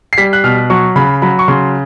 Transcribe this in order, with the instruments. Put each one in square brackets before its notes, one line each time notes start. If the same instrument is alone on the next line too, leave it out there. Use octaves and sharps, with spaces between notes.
[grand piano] C7
G3 B6
F#6
B2 F6
F#3 C#6
C#3 B5
F#3 B5
C#6
C#3 C6